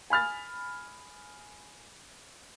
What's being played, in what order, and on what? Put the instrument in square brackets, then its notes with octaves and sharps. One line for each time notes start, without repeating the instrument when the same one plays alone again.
[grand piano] G#5 B5 F6 A6